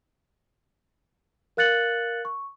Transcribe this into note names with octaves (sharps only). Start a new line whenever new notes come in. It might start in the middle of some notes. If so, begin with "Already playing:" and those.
A#4 F5 F#6 A6 C#7 F#7
C#6